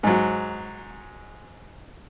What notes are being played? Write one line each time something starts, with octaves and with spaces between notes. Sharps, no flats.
G#2 F#3